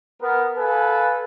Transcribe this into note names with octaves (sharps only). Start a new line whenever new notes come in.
B3 A#4
A4 B4 F5 G#5